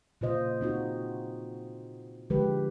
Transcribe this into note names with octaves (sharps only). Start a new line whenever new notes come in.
A#2 C#3 F4 C5 D#5
C4 D#4 F#4
D3 F3 G#3 G4 B4